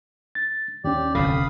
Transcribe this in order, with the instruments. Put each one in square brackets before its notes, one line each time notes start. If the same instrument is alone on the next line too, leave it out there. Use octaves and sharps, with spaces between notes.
[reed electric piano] A6
[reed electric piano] D#2 C#4 [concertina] G4 D5
[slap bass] F1 F2 D3 [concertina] F5 B5 D#6